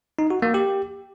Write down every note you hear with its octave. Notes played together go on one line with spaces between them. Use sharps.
D#4
F#4
A#3
G4